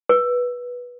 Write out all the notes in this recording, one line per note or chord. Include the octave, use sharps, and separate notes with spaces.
B4